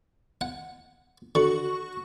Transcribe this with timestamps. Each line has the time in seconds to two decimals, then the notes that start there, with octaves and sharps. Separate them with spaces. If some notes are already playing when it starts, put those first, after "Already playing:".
0.41 F#5
1.35 D3 F#4 C#6